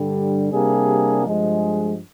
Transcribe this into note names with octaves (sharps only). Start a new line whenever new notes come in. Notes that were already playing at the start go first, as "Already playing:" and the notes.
Already playing: G2 D3 G3
C3 G3 A#3 D4 G#4
G2 F3 G#3